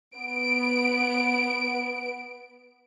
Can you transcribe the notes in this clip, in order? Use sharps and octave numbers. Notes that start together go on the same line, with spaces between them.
B3 D7